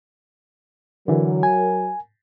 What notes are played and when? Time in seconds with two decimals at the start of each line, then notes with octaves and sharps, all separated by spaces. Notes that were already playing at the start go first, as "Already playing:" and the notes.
1.08 D3 E3 F#3 A#4
1.43 G#5